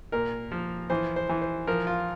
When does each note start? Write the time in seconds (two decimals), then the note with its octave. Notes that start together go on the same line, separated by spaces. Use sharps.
0.12 A#2 A#4
0.52 F3
0.90 E3 C5
1.16 C5
1.29 E3
1.42 C5
1.67 F3 A#4
1.87 F4